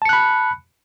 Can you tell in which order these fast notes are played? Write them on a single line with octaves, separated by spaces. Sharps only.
A5 C#7 F#6 B5